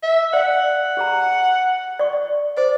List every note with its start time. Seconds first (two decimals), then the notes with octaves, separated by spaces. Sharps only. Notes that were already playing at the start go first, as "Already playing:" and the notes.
0.03 E5
0.33 D5 F5 F#5
0.97 G4 G#4 A#5
1.99 D5 C#6
2.57 C5 D5